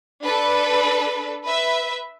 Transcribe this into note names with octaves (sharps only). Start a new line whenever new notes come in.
D4 A4 B4
B4 E5